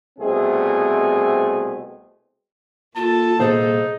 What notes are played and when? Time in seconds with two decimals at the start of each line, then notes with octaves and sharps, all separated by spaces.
0.19 C2 B2 A3 C4 G#4
2.96 A#3 F4 A4 A5
3.40 C2 A#2 D#4 G#4 C5